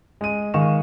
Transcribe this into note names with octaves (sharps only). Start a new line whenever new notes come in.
G#3 D#7
D#3 G#3 D#5 F5 C#6 E7